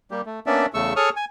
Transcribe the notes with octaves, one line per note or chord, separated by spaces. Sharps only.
G3 A#3 G4
A3
A#3 B3 C#4 D4 D5 E5
E2 C#3 A3 C#6 E6
G#4 A4 C#5 C#6 D#6 F6
G#5